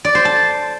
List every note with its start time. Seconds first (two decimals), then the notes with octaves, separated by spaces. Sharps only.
0.05 D5
0.15 C5
0.25 A5